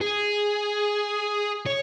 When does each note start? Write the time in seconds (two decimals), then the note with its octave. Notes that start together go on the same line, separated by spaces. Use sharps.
0.01 G#4
1.66 C#5